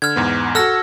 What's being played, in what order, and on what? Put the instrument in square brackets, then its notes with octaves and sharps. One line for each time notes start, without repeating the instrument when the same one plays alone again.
[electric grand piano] D3 [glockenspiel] F6 G#6
[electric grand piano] E2 G#2 B3
[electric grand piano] F#4 A4 [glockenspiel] E6 F6 A#6